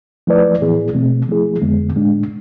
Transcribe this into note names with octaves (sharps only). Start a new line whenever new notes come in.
F3 A3 E4 B4 D5
A2 E3 B3 E4 G#4
B2 A3 C4
F3 A3 E4 G#4
F2 D3 G#3 B3
A2 G#3 D4